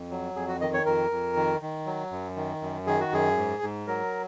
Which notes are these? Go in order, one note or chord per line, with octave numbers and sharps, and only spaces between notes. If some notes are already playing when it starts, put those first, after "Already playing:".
Already playing: F2
F#3
F2 G#4
F#4
D#3 D#5
C#5
F2 A#4
F2
D#3
D#3
F#3
F#2
D#3
F#2
D#3 G#4
F#4
F#2 G#4
G#2
G#2
F#3 A#4